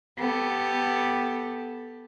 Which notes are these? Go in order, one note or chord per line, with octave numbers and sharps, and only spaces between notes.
B3 G4 A4